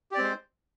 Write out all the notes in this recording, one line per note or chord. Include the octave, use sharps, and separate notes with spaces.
G#3 C4 G4 C5 D5